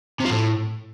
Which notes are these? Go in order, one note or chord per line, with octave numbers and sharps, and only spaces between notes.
C3
F3
A2